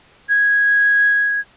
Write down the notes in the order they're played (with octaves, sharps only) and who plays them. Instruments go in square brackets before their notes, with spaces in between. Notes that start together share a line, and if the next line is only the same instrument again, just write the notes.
[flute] G#6